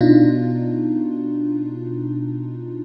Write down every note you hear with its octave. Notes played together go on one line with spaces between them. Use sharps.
B2 D4 D#4 F4